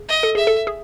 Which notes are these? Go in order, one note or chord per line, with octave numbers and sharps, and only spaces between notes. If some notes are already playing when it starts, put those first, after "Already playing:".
Already playing: G#4
D#5
A4
G#4 E5
A4
G#4